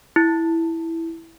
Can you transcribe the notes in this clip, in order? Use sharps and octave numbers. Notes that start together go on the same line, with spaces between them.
E4